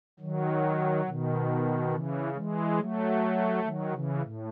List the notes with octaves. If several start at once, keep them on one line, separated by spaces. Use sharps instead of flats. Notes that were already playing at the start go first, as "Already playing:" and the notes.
D#3 F#3
B2 D#3
C#3 E3
E3 G#3
F#3 A3
D#3 F#3
C#3 E3
A2